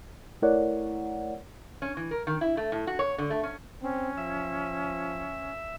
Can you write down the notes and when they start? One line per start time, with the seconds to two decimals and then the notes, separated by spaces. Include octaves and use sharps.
0.42 A3 E4 A#4 C#5 D5 F#5
1.82 C#4
1.97 E3
2.11 A#4
2.27 D#3
2.41 E4
2.57 A3
2.72 A2
2.87 F#4
2.99 C#5
3.18 D3
3.30 A3
3.43 C#4
3.82 C4 C#4
4.17 F3 E5